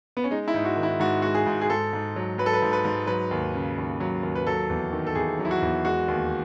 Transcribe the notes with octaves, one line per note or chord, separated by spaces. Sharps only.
B3
C#4
G#3 D#4
E4
G#2
F#4
D#3
E4
G#2 F#4
G#3 F#4
G#4
G#2
G#4
G#2 A4
G#2
F#3
F#3 B4
A4
B4
G#2
B4
G#2
F#3 B4
D#2
C#3
D#2
F#3
D#2
B4
F#3 A4
E2
D#3
A4
E2 G#4
F#3
E4
F#4
E2
G#3 F#4
D#2